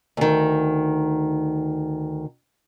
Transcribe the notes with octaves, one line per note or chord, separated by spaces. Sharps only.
D2 D#3